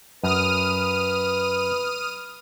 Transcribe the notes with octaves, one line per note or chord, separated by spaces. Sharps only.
F#2 B4 D#6 F6 D#7